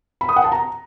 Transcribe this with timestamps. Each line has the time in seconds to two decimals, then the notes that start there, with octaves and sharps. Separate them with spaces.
0.21 B5
0.29 D#6
0.36 F#5
0.44 A5
0.52 A#5